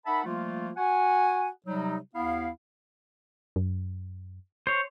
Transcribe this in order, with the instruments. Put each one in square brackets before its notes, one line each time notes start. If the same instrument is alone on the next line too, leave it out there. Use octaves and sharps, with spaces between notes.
[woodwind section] D#4 A#4 E5 F#5 A5 B5
F3 G3 A3 A#3 F4
F#4 F#5 G#5
C3 F#3 G3 D#4
D#2 B3 E4 F5
[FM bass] F#2
[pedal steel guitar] C5 C#5